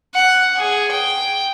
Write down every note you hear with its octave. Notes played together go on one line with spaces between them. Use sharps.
F#5
G#4
G5